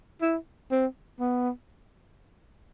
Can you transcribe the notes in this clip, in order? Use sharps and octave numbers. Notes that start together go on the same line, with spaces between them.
E4
C4
B3